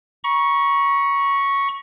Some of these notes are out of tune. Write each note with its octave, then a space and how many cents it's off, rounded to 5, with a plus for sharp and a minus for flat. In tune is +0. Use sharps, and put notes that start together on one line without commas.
A#5 +45 C#6 +0